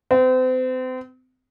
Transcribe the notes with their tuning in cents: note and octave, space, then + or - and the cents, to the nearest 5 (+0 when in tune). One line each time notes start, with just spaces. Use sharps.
C4 -35